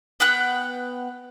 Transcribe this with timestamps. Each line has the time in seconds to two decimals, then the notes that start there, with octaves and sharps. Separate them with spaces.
0.20 B3 F#5 G5 F#6